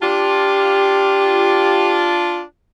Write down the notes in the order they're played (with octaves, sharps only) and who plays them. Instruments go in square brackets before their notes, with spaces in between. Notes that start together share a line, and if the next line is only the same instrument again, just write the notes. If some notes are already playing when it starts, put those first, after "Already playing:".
[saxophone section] D4 F4 [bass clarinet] G4